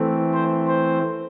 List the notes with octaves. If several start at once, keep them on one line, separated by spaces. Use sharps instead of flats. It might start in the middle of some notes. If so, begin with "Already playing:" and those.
Already playing: E3 A3 C4
C5
C5